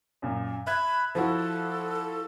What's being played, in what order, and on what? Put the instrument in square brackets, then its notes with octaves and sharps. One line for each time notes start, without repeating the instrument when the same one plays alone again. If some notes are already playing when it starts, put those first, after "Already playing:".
[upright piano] F#2 A#2
[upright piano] E5 F#6 G#6 [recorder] B5
[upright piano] F3 E4 F#4 [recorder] A4